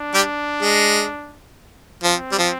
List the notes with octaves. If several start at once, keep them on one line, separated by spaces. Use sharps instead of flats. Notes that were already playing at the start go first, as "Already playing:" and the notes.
Already playing: D4
G3 G4
G#3
F3 C4
G3
F3